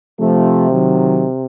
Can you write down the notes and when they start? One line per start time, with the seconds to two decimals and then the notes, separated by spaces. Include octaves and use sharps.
0.19 C3 F3 A3
0.71 D#3 F#3